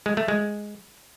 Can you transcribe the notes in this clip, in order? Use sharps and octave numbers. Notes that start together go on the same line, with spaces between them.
G#3
A3
G#3